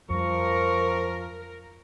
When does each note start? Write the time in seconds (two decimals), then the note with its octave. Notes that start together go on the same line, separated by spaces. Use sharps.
0.10 F2 F3 G3 A#4 C#6